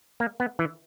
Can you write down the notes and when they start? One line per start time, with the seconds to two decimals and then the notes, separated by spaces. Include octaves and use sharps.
0.20 A#3
0.40 B3
0.59 E3